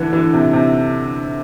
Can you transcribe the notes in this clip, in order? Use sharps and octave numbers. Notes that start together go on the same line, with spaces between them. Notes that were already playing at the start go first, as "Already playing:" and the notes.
Already playing: D3 E3
E3
C3
C3